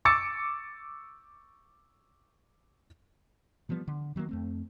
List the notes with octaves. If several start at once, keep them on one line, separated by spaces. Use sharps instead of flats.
C#6 D6 E6 A6 C#7
E3 F3 G3 B3
D3
D#3 F#3 G#3 A#3
F2 A3 C4